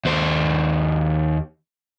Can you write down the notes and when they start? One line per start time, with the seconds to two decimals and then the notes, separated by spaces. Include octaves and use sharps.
0.05 D#2 C5